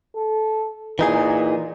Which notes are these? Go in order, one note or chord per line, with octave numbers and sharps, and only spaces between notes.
A4
A#2 E3 D#4 G#4